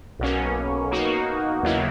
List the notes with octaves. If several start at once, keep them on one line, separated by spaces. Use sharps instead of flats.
B1 B2 A#3 C#4
B2 A#3 D#4 F#4
D#2 C#3 F#3 A#3 E4